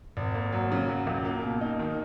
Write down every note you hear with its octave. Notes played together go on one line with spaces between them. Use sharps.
G#1
A#3
F#3
C#3
F#3
C#2
A#3
B2
D#4
D#3